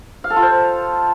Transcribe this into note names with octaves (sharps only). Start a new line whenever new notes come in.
F5
A4
F4
C5